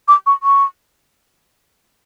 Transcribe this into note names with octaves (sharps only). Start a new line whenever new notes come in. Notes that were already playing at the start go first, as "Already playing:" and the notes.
D6
C#6
C#6